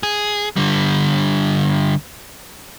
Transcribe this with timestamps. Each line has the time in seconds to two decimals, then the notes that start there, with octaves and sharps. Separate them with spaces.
0.03 G#4
0.57 D3 G3